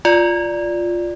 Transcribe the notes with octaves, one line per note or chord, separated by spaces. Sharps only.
F4 D5